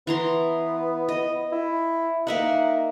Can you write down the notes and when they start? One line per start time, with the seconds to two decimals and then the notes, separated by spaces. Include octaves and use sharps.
0.07 E3 B3 A#5 C6
1.09 D#5
1.52 E4
2.27 A#3 D#4 E5 F#5